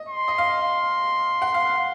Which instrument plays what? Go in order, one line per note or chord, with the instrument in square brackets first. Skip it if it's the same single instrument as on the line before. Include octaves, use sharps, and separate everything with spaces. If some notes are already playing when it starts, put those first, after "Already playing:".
Already playing: [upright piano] D#5
[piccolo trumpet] C6
[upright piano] D#5
F5
F#5
F5